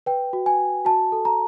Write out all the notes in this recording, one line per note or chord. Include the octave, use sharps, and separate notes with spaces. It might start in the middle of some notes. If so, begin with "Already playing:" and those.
B4 G5
F#4
G#5
F#4
F#4 A5
A4
A#5